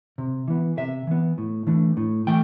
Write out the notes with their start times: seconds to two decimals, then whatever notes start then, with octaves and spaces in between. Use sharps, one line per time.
0.18 C3
0.48 E3 B3
0.78 C3 E5
1.07 E3 B3
1.38 A2
1.67 E3 A3 D4
1.97 A2
2.27 E3 A3 G5